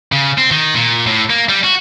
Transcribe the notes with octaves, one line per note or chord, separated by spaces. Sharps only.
C#3
C4
D#3
A#2
A2
A#3
G3
F#4